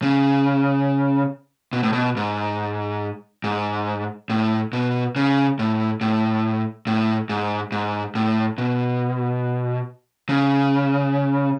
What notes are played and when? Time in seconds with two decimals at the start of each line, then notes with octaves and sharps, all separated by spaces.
0.02 C#3
1.73 B2
1.83 A2
1.93 B2
2.17 G#2
3.44 G#2
4.30 A2
4.73 B2
5.16 C#3
5.59 A2
6.01 A2
6.87 A2
7.29 G#2
7.72 G#2
8.15 A2
8.58 B2
10.29 C#3